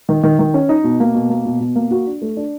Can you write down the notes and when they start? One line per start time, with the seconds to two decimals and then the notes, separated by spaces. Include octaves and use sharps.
0.09 D#3
0.23 D#3
0.39 D#3
0.54 C#4
0.69 D#4
0.84 B2
1.00 A#3
1.15 B2
1.30 A#3
1.45 B2
1.60 B2
1.76 A#3
1.91 F#4
2.07 D4
2.21 A3
2.37 D4